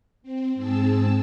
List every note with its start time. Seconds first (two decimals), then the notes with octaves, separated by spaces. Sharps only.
0.23 C4
0.55 G#2 C4 G#4 A5 E6